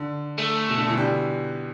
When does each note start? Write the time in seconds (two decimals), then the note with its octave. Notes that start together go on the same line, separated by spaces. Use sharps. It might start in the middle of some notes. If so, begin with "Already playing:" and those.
Already playing: D3
0.38 A3
0.69 B2
0.78 D3
0.88 B2 E3
0.97 D3 G3